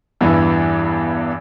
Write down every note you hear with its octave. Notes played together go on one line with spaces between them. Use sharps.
E2 G2 E3